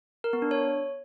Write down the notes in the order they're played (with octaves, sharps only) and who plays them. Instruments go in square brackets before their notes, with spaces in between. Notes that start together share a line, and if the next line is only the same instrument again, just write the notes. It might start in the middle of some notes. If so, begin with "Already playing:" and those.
[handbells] A#4
B3
D4
C#5